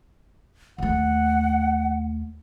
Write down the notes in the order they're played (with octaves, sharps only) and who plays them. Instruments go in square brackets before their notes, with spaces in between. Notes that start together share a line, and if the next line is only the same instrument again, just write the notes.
[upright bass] D#2 A3 [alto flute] F#5